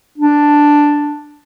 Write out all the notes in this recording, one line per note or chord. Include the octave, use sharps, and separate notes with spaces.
D4